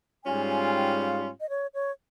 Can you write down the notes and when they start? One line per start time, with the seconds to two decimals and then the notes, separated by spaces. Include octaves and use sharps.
0.24 G#2 G3 C#4 F4 G#5
0.50 G#5
0.63 G#5
0.75 G5
0.99 F5
1.40 D#5
1.49 C#5
1.74 C#5